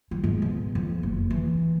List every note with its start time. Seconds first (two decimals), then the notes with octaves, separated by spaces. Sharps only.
0.11 G3
0.24 G#2
0.42 B2
0.75 F2
1.03 F#1
1.31 E3